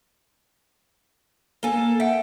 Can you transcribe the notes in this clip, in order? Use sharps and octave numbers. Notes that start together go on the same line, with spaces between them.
A#3 A4 G#5 G7
E5 F#5 G5